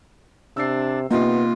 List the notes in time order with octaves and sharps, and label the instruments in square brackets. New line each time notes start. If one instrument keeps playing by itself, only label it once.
[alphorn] C3 [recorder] D4 [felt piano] E6 C7
[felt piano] C2 D#4 [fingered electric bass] A#3 [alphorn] B3 [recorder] F4